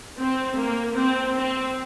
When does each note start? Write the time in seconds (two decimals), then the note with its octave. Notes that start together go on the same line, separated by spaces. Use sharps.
0.21 C4
0.59 A#3
0.97 C4
1.36 C4